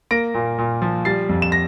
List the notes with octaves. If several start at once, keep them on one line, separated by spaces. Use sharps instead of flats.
A#3 A#6 D7
A#2
A#2
F3
G3 A6 C7
F2
E7
A#6